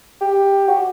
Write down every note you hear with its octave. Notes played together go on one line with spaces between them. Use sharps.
G4
F#4